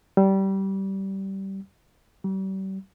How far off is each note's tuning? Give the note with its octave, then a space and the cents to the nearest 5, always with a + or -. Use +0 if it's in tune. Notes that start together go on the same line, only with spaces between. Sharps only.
G3 -20
G3 -40